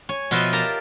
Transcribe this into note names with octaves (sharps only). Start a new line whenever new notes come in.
C#5 G#5
B2 F3 F4 B4 D#5 E5
G4 A#4 A5 A#5